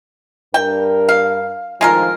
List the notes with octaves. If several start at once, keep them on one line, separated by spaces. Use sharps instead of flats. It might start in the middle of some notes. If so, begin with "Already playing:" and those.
G2 A#4 G5
F5
A2 D#3 F3 G#3 F4 A#4